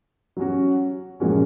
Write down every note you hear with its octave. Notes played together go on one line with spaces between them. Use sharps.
F#3 C#4 F#4
A#2 F3 G#3 C#4 F#4